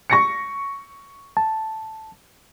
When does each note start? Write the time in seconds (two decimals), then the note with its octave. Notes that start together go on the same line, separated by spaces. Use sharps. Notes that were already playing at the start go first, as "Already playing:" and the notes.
0.10 C#6 A#6 C#7
1.37 A5